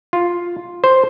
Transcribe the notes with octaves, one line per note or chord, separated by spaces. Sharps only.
F4
C5